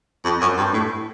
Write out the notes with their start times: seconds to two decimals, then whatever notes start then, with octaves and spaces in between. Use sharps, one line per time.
0.24 F2
0.41 F#2
0.57 G2
0.73 A2